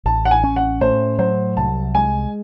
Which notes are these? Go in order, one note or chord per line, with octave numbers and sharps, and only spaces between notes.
A1 A5
F#5
G#5
C#4
F#5
A2 C5
F#3 C5
C2 A5
G#3 G#5